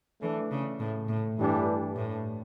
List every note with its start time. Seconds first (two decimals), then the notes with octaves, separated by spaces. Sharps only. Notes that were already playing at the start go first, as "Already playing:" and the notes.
0.21 E3 A3 D4 A4
0.51 C#3
0.80 A2
1.08 A2
1.38 G2 E3 A3 D4 G4
1.96 A2